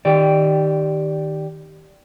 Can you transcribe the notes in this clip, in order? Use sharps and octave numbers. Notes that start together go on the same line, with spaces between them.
D#3 G4 D5